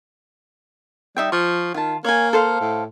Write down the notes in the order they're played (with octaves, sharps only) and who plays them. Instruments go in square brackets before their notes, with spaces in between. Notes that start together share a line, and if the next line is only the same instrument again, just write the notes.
[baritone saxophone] G3 [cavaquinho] D#4 E5 G5
[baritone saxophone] F3 [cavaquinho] C#6
[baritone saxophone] D#3 [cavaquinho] F4 A5
[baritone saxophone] A#3 [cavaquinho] C#5 G#5
[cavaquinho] A4 C5 F5
[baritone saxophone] A2